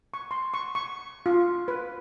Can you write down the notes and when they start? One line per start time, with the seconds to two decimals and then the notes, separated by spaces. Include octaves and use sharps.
0.14 C#6
0.31 C6
0.54 C#6
0.75 C#6
1.26 F4
1.68 B4